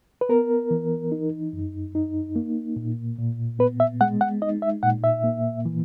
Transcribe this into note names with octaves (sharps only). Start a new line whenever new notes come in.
B4
B3 A#4
E3
D#4
F#2
D#4
A#3
A#2
A#2
B3 B4
E5
G#3 F#5
F#5
D#4 D#5
E5
A#2 F#5
E5
A#3
E3